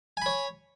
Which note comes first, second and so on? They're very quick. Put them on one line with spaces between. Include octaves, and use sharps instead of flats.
G#5 B5 C#5